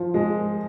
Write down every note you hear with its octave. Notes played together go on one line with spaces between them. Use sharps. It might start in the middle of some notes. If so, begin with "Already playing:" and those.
Already playing: F3
G#3